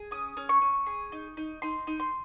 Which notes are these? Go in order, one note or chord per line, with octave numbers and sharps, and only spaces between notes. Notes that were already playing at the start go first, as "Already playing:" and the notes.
Already playing: G#4
C#4 D#6
C#4
C#6
C#4
G#4
D#4
D#4
D#4 C6
D#4
C6